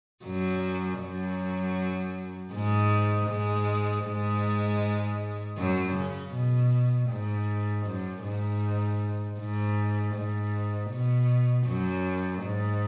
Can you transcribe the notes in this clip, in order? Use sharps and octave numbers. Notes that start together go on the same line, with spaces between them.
F#2 F#3
F#2 F#3
G#2 G#3
G#2 G#3
G#2 G#3
F#2 F#3
C#3
B2
G#2
F#2
G#2
G#2
G#2
B2
F#2 F#3
G#2